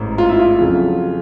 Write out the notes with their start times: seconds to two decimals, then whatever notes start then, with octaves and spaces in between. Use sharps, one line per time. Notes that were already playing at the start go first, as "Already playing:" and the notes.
Already playing: A1 G#2
0.18 F4
0.29 E4
0.39 F4
0.58 F2 C#3 F#3